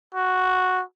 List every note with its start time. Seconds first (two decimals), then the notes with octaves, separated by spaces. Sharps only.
0.15 F#4